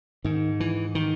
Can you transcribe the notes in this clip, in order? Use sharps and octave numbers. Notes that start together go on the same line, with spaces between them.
G#2 D#3
E3
D#3